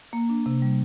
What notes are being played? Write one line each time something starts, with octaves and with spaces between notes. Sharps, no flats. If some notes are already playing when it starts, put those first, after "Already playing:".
A#3
D4
C3
G3